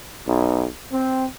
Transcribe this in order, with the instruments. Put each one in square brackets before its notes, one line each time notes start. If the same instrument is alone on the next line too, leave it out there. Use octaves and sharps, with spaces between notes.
[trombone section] B1
C4